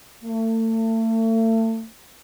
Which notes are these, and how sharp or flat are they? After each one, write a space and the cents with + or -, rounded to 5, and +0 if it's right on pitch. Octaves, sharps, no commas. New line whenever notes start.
A3 +35